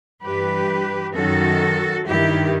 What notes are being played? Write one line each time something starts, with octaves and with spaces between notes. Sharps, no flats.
G2 E3 G4 B4
F#2 D#3 F#4 A4
G2 D#3 E4 G4